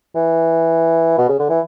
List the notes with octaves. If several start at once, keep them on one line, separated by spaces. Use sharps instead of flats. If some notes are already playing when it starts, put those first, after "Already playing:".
E3
B2
C#3
D3
E3